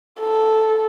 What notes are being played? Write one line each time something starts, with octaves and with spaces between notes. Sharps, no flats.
A4